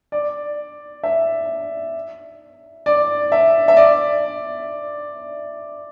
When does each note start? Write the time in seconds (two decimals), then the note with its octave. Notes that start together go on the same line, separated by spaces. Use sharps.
0.12 D5
1.03 E5
2.86 D5
3.32 E5
3.68 E5
3.77 D5